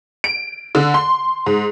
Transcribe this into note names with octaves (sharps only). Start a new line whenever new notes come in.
D7
D3
C6
G#2